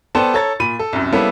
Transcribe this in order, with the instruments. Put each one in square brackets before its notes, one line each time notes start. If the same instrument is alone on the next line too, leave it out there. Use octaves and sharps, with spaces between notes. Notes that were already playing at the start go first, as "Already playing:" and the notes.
[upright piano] B3 A4 C5 D5 G5 A5
A4 C#5 A#5 A6
A#2 B5 D#7
A4
C2 F#2
G3 A#3 B3 C#4 E4 A4